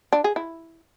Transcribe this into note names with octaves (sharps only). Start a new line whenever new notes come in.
D4
G#4
E4